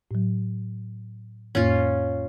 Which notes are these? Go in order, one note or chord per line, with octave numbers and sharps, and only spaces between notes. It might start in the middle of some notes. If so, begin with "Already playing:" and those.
A2 F#3
F2 A2 A#3 C#4 F4